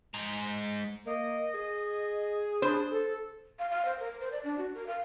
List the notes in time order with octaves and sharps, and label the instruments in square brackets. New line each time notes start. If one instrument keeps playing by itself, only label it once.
[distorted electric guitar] G#2 A#5
[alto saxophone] A#3 [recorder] D#5
[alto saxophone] G#4
[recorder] D4 [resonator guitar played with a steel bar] C5
[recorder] A4
[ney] F5
F5
C5
A#4
C5
D5
D4
F#4
A#4
F5